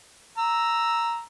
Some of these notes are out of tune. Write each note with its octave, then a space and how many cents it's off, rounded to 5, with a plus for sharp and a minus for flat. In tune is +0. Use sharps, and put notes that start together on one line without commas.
A#5 +0 E6 +0